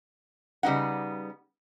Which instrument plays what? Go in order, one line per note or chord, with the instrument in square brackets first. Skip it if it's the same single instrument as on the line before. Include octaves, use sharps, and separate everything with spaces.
[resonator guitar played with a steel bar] C#3 G3 B3 D#4 F#5